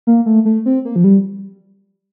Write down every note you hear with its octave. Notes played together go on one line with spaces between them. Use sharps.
A#3
A3
A3
C4
A#3
F3
G3